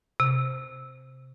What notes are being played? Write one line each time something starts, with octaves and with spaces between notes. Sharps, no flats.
C3